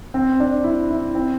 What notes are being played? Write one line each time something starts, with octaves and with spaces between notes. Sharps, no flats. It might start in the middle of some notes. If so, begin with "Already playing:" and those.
C4
D4
E4
E4
C4